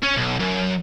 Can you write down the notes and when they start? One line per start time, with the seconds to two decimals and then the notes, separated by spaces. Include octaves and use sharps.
0.03 C#4
0.16 B1
0.40 F#2